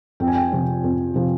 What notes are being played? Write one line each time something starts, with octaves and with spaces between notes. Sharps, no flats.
F2 G5
G#5
G5
C3 F3
F2
C3 F3